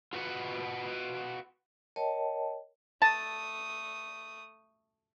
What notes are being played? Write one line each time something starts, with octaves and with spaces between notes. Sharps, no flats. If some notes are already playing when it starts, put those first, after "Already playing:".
F4 F#4 B4 F#5
A#4 C#5 D#5 G5 A5
A3 A5 D#6 A6